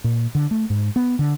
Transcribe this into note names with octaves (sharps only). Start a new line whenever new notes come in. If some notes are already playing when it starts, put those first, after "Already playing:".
A#2
D3
A3
G#2
B3
D3